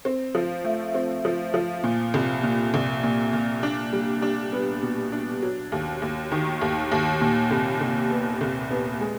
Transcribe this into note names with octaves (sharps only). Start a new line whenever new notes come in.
C4
F3
A3
C4
F3
F3
A#2
C2
A#2
C2
A#2
A#2
D4
G3
D4
B3
B2
D4
F#3
D#2
D#2
D#3
D#2
D#2
A#2
C2
C2
B3
C2
B3
G#3